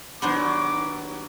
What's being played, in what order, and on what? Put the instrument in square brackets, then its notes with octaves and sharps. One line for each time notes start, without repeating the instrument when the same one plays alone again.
[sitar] D#2 F#3 [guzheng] B3 D4 C5 [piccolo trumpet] D6